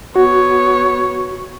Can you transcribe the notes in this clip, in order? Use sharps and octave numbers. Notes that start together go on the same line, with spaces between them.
B3 F#4 C#5